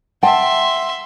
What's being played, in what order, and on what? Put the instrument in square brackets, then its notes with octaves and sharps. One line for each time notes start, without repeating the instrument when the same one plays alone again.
[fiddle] E5 C6 [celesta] F#5 [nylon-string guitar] G5 A5